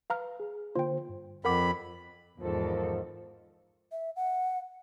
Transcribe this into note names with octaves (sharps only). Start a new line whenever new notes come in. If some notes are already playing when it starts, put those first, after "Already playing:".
B4 F5 A#5 F6
G#4
D3 A#3 F4 C5 G5
G2
F2 A#4 F#5 B5 D6
E2 G#2 D#3 F3 A4
E5
F#5